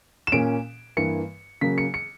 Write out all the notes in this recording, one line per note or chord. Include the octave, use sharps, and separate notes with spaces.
E7
A#2 A#3 C#4 D7
G2 E3 A#3 C#7
C#3 F#3 A#3 B6
C#7
C#7